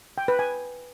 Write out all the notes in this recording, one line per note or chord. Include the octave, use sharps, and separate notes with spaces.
G5
B4
G#5